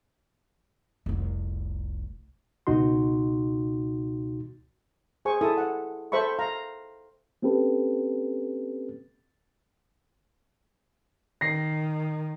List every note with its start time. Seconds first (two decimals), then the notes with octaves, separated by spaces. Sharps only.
1.06 F1 C2
2.67 C#2 B2 D#4 F#4 C6
5.25 G#4 C5 G#5 C#6
5.41 E4 A4 D#6
5.58 F#5
6.12 A4 C5 E5 B5 C#6
6.39 F5 A#5
7.42 A#3 C4 C#4 G4 A4 B4
11.41 D#3 A#6 C7